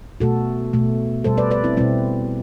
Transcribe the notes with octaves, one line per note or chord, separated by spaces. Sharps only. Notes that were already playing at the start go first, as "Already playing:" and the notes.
B2 A3 F#4 A4
B2 A3
B2 G3 A4 C5
B4 D5
B4 D5
C4 E4
B2 G3 C4 E4